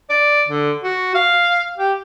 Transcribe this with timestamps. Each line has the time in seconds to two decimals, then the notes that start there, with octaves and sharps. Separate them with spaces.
0.10 D5
0.48 D3
0.84 F#4
1.15 F5
1.78 G4